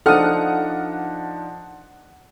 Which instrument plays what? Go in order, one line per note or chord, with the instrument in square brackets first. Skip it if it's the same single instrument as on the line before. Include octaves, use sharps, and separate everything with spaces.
[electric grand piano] F3 D4 D#4 [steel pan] A4 D#6 [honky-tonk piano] F#5 F6